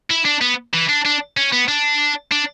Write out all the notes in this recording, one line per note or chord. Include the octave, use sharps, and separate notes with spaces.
E4
D4
B3
E3
D4
D4
C#4
B3
D4
D4